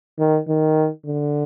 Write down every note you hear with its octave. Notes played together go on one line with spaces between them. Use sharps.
D#3
D#3
D3